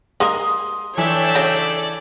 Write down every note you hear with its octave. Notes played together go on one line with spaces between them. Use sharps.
G#3 A#3 A#4 C6 D#6
E3 D4 A4 C#5 D5 E5 G5
C#3 F#3 D#4